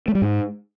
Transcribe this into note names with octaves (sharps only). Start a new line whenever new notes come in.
A3
G3
G#2